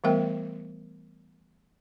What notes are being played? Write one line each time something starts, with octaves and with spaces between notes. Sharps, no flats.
E3 G3 A3 B3 A#4 G5